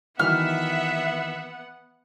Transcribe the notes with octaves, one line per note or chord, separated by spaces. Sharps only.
D#3 E3 F#3 B3 E5 F#5 F6